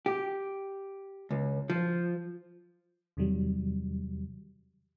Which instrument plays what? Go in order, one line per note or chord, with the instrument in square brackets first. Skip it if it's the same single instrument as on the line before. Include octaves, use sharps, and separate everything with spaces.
[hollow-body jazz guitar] G4
C#2
F3
[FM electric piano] E2 C3 D#3 F#3 G3